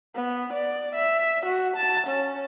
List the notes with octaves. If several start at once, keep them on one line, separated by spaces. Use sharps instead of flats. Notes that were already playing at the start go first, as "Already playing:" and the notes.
B3
D5
E5
F#4
A5
C#4